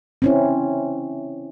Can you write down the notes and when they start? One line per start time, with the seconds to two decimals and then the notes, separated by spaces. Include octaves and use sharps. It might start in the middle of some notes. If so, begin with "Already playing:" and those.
0.22 C4 C#4 E4